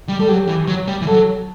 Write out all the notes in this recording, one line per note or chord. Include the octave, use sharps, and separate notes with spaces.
G3
G3 A4
F#3 G4
E3
F#3
G3
E3
F#3 A4